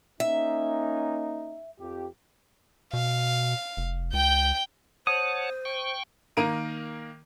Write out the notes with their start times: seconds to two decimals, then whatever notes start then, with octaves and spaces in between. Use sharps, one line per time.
0.20 A#3 C#4 D#4 E5
1.79 F2 G4
2.93 B2 F5
3.77 F1
4.13 C#2 G5 G6
5.07 C5 C#5 F#5 A5 D#6
5.65 G5 C#6
6.37 D#3 A#3 A#4 A#5 D7 D#7